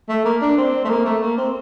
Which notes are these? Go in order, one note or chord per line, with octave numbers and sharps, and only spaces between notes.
A3
A#3
D4
C4
A3
A#3
A3
A#3
C4